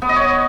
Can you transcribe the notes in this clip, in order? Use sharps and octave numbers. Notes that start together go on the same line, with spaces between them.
B3
D#5
C#5